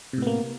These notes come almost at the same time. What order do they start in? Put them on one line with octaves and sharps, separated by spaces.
C3 A2 B3 A#3